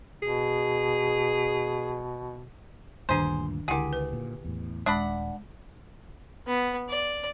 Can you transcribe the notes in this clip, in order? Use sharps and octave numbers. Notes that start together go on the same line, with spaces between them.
B2 G#4
D2 G2 A#2 D#3 D4 G#4 C5 G#5
C#2 D3 E4 G4 G#4 F#5
B4
A#2
E2 A2
D#1 G#3 D4 F#5 B5
B3
D5